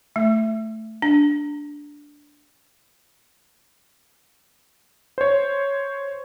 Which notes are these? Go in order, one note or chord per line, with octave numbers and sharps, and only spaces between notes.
A3
D4
C5 C#5